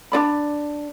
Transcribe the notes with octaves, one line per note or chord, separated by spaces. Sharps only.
D4 F4 D5 B5